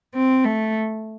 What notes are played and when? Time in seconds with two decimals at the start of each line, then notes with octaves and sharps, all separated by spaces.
0.15 C4
0.44 A3